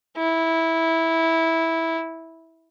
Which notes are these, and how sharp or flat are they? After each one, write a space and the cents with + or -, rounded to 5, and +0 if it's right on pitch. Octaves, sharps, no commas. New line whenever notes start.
E4 -10